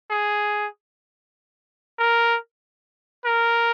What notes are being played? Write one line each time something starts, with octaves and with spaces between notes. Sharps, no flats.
G#4
A#4
A#4